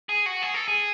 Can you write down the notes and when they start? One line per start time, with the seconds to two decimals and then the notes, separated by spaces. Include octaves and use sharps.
0.09 G#4
0.26 F#4
0.42 G#4
0.54 A4
0.68 G#4